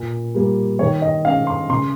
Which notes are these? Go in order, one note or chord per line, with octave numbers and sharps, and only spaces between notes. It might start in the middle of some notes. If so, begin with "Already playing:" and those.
Already playing: A#2
G3 A#3
D#3 C#5
D#5
G#3 C#4 F5
C6
C#3 C6